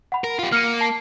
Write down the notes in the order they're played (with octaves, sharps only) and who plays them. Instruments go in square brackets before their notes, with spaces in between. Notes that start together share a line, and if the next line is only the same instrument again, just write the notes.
[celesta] F#5 B5
[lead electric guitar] A#4
F4 G4
[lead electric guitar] A#3 [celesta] F6 C#7 D#7
[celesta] A5 C7